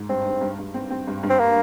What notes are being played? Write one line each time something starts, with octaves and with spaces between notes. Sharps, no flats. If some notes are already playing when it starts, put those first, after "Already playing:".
Already playing: G#2
G2 C4
G2
G2
G2
C4
C4
G2
G2
C4
A#3